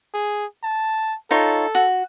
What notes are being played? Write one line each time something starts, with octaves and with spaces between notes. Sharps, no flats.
G#4
A5
D#4 F4 A4 C#5
F#4